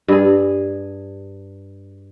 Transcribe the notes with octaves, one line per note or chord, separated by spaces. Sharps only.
G2 G#4